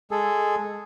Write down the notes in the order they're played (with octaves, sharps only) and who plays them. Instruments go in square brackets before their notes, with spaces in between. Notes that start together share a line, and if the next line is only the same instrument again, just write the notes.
[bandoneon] G#3 G#4 A4